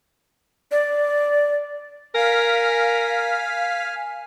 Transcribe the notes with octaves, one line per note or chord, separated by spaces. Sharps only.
D5
A#4 F5 G#5 F6 B6